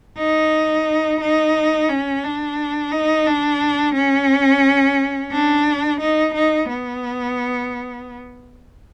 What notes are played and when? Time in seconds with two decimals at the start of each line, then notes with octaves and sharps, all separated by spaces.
0.18 D#4
1.21 D#4
1.89 C#4
2.24 D4
2.92 D#4
3.27 D4
3.95 C#4
5.32 D4
6.01 D#4
6.35 D#4
6.70 B3